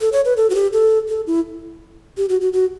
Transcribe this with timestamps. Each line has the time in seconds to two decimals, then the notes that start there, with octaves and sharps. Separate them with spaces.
0.01 A4
0.13 C#5
0.25 B4
0.37 A4
0.50 F#4
0.55 G4
0.73 A4
1.09 A4
1.27 E4
2.17 G4
2.29 F#4
2.41 F#4
2.53 F#4